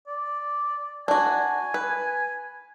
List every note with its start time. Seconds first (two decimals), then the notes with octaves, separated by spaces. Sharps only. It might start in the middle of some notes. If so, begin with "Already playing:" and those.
0.07 D5
1.08 D4 F#4 G#5
1.74 B4